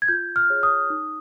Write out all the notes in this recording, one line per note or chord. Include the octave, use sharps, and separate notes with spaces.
G#6
F4 G6
F6
G#4 C#5
D#6
D#4